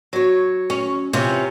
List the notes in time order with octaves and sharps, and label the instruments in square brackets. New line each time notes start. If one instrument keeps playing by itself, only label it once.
[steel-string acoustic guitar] F#3 C#5
[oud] C#4
[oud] C3 [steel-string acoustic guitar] E3 C#4 F4